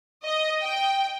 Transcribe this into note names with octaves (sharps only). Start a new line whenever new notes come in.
D#5
G5